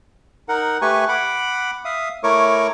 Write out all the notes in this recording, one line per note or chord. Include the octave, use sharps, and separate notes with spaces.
D#4 A#4 F#5
A3 G4 B4 G#5 C#6
F#5 B5 D6
E5 F5 D#6
A3 E4 A#4 C#5 C#6 D6